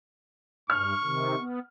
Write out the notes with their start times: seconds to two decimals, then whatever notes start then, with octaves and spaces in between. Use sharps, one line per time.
0.70 G2 C#6 F6
1.03 C3 D#3
1.38 B3